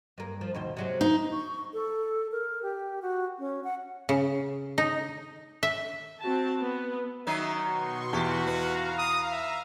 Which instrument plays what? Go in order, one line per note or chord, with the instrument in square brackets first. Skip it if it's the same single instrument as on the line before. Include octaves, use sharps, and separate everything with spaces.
[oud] G2 A#3
F3
D#2 B2 C5
C3 F#3 G#3
[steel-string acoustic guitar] D#4
[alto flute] C#6
A4
A#4
G4
F#4
C#4
F#5
[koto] C#3
D#4
E5
[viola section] C4 F#4 A5
B3
[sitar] D#3 F#3 D#4 [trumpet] E5
[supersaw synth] B2 C6 C#6 [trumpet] F#4
[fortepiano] E2 [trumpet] F#4 [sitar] G4
[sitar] B4 [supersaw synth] F5 A#5
[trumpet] D#6
E5